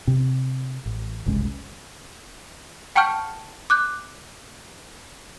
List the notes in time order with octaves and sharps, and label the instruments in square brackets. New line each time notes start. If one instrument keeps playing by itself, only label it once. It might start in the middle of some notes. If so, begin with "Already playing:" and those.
[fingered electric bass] C3 C4
A1
F#1 C2 G#3 C#4
[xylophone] F#5 G5 A5 C#6 F6 G6
D6 F#6 G6